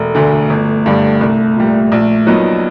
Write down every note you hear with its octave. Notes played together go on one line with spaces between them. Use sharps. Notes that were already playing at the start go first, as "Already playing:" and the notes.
Already playing: E1 A3
D2 D3
G1
G2 D3 G3
C2
A#2 G3
A#1
A#2 F#3 B3 D#4